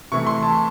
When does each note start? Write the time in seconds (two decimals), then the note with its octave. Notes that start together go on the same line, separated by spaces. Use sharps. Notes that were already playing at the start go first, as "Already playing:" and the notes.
0.12 C3 E3 A3 C#6
0.27 C6
0.43 A5